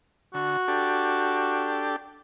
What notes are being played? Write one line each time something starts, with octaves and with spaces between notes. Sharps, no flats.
D3 F#4
D4 G4 A4